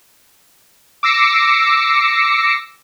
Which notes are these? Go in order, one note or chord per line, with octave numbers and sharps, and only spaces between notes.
D6 E6 A#6 C7 C#7